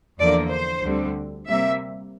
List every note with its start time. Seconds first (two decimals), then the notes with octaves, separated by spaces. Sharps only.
0.19 E2 D3 F3 A#3 D5
0.51 C5
0.83 D2 D3 G3 C4
1.48 C3 G3 A#3 E5